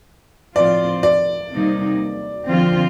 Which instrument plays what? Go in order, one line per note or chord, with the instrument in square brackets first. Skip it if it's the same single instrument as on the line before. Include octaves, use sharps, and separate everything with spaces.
[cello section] A2 F3 C4 F4 [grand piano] D5
[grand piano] D5
[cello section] C3 G3 A#3 D#4
D3 F3 C4 F4